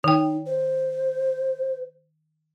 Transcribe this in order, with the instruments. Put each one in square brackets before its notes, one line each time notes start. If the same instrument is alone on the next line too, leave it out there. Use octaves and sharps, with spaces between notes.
[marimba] D#3 G5 [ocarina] D#4
[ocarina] C5